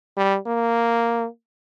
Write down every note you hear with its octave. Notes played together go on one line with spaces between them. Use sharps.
G3
A#3